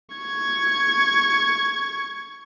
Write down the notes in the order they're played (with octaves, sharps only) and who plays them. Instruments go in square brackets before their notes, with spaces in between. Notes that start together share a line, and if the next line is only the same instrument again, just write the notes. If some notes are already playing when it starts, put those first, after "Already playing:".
[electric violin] C#6 G#6